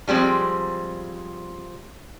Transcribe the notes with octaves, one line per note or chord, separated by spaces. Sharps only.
F3 G3 G#3 C4